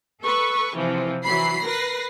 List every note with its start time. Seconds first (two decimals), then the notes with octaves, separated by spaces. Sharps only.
0.22 A4 B4 C#6
0.76 C3 E3 F3
1.23 E3 F#3 B5 C7
1.64 A#4 B4 A#6 C7